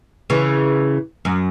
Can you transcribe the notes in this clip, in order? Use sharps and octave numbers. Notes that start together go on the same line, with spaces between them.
C#3 E3
F#2